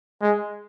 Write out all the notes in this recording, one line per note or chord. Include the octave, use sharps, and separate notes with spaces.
G#3